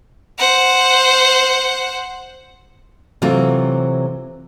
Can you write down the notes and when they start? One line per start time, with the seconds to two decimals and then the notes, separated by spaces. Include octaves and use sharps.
0.38 C5 F#5
3.22 C3 E3 F#3 A3 C4 F4